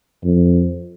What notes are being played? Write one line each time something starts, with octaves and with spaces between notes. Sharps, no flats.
F2